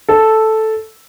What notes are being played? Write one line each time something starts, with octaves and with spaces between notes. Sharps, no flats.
A4